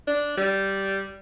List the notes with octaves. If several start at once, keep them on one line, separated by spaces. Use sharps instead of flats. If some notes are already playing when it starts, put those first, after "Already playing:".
D4
G3